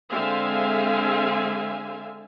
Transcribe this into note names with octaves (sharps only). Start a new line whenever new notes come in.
D3 G#3 C4 E5 F5 G#5